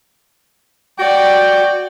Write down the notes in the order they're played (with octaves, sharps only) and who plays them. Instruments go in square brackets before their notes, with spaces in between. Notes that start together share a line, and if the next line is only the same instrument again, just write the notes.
[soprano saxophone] F#4 [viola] D5 [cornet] G5